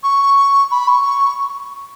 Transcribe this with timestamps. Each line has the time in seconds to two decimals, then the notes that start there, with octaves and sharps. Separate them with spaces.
0.03 C#6
0.71 B5
0.88 C#6